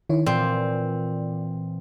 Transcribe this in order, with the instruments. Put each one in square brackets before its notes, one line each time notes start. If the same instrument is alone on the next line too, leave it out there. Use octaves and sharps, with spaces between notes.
[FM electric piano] D#3 E4 C#5
[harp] A#2 E3 F4 [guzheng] C4 [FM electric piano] D5